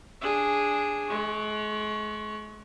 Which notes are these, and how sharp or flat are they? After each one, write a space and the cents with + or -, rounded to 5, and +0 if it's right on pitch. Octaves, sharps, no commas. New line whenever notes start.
D4 -5 G#4 -5
G#3 +40 C#6 +0